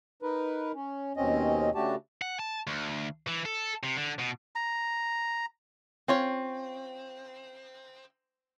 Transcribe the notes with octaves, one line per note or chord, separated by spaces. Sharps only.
D#4 A#4 B4
C#4
D#2 B2 C4 C#4 D#5
C#3 A3 D4 F#4 G4 A5
F#5
A5
D2
E3
A4
C3
D3
B2
A#5
C4 C#4 F4 C#5